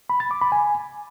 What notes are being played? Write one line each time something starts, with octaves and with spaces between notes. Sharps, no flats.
B5
A6
D6
B5
G#5